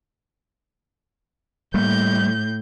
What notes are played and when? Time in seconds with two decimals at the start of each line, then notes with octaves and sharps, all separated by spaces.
1.74 A2 G3 A3 A#3 G6